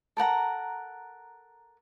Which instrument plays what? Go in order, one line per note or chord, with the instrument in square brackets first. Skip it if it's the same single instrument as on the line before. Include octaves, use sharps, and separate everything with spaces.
[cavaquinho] A4 A#4 F#5 A#5